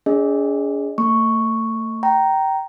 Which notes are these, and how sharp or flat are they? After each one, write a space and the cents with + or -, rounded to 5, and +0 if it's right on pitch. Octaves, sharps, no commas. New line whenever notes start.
D4 -45 G#4 +0 D#5 +0
A3 +40 C#6 +0
G5 -20 A#5 +0